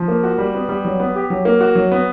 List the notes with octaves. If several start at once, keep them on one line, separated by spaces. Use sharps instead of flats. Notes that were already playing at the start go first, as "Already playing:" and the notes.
Already playing: F3
A#3
F#4
G3
B3
G3
F#3
B3
G4
F#3
A#3
F#4
F#3
B3